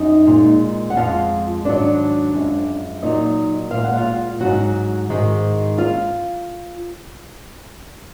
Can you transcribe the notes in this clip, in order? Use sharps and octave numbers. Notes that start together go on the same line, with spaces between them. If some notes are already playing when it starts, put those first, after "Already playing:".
Already playing: F#2 D#4 D#5
A#2 G#3
F#5
F2 F3 G#3 F4 F5
G#2 D#3 F#3 D4 D5
F#2 F3 G#3
A#2 F#3 D#4 D#5
A#2 G#3 F5
F#5
F4 F5
G#2 D#3 F#3 F#4 F#5
G#2 D#3 G#3
F4 F5